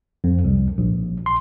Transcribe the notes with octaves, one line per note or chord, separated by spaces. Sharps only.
F2
C2
A#1
C6